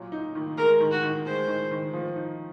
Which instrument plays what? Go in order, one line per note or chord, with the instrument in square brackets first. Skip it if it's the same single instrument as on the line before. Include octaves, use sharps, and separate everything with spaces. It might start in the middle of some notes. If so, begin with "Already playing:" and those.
Already playing: [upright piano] A#2 F#3
D#4
D#3
[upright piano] G#3 [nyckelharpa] A#4
[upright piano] D#3
[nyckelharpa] F#4
[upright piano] D#3
[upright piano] G#3 [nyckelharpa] C5
[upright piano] D#3
D#3
F3
D#4